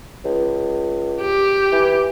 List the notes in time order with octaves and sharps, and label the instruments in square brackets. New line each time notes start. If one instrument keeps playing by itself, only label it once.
[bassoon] C#2
[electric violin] G4
[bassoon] E3